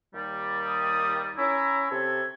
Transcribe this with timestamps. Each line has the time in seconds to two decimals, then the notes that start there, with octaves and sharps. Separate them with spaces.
0.14 D#2 D#3 G3
0.68 D#6
1.38 C#4 E4 A#5
1.91 C3 A4 G#6